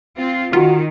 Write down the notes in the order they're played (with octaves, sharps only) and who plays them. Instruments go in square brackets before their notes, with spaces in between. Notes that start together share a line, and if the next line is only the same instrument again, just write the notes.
[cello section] C4 F4
[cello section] D#3 [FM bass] F4 [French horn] F#4